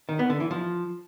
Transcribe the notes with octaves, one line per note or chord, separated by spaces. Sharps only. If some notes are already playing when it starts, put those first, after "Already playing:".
D#3
B3
D3
E3
F3